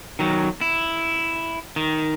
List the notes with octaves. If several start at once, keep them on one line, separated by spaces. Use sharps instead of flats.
D#3 F#3
E4
D#3